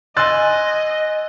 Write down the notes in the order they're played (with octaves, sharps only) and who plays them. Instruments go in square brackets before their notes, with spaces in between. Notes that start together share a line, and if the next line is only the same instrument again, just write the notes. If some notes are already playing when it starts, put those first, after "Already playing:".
[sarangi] D#5 [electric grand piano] G#5 E6 [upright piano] C6 F#6 A6